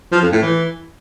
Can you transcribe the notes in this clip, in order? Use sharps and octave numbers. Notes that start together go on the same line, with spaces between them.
F3
F2
A2
E3